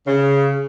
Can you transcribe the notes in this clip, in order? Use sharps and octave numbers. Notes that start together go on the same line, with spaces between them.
C#3